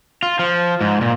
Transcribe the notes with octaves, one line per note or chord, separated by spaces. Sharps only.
F4
F3
G#2
A#2